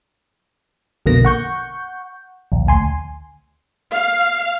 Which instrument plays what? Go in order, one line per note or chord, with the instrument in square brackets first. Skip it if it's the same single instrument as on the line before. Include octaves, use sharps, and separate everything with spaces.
[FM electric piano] A#1 F2 B2 D3 A#3 A#6
F#5 C#6 G6
A#1 D#2
D2 G#5 C6
[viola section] F5